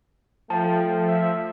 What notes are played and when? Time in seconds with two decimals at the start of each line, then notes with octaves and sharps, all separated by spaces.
0.50 F3 A3 G5 A5
1.08 E5